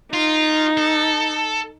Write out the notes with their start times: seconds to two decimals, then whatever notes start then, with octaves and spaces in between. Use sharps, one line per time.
0.13 D#4 F4
0.78 A4